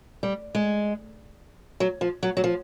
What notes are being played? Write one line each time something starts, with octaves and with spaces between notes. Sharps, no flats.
G3
G#3
F#3
F3
F#3
F#3
F3